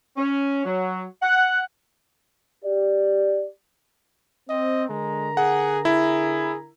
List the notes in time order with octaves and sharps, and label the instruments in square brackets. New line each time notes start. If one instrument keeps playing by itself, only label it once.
[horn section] C#4
F#3
F#5
[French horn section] G4 D5
[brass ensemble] C4 [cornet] D#5
[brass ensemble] D3 A#4 A#5 [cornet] G#3
[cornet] G#4 [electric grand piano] F#5
[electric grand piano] E4 [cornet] G#4